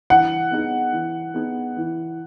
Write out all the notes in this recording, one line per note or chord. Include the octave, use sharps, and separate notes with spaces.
E3 F#5
B3 D#4 G#4
E3
B3 D#4 G#4
E3